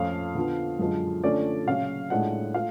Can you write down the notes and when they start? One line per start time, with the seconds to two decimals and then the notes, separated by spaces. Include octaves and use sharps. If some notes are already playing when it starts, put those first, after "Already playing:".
Already playing: F2 F3 A3 C#4 F4 F5
0.35 D3 F3 B3
0.79 F#2 D3 F3 G#3
1.24 D3 F3 A3 C#4 D5
1.67 C#3 F#3 C#4 F5
2.10 A2 G#3 D4 F4 F#5
2.54 A3 F4 F5